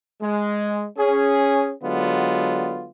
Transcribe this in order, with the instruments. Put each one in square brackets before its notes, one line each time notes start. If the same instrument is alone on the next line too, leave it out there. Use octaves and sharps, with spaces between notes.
[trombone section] G#3
C#4 G#4
D3 F#3 G#3 B3 F4